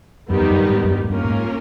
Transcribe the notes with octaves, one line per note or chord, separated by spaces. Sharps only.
F#2 D#3 G3 B3 D#4 G4
F2
F#2
G2
G#2
F#2
G2
G#2
G2 A#3 C#4 F4 A#4
A2
G#2